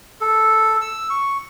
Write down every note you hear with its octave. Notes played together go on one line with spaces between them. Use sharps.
A4
E6
C#6